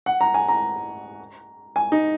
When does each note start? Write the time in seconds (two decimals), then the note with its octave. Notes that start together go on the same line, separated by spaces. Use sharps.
0.06 F#5
0.21 A#5
0.34 G#5
0.48 A#5
1.76 G#5
1.92 D#4